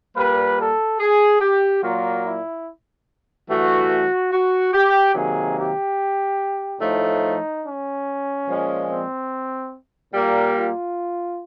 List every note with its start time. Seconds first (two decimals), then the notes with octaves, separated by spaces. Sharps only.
0.16 A#2 G3 A#3 B4
0.57 A4
1.00 G#4
1.41 G4
1.82 A#2 F#3 A#3 F4
2.24 E4
3.48 G2 E3 A3 F#4
4.32 F#4
4.73 G4
5.14 C3 D#3 F#3 A#3 G#4
5.56 G4
6.80 A2 F3 A3 D#4
7.64 C#4
8.47 A#2 F3 G#3
8.89 C4
10.13 A#2 G3 A#3
10.55 F4